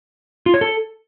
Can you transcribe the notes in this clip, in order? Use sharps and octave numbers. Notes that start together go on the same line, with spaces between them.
F4
C#5
A4